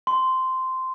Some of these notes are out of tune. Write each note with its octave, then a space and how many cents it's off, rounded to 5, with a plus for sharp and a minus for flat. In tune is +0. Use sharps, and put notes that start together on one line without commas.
C6 -10